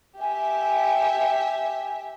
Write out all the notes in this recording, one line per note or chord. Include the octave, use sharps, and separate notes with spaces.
G4 E5 G#5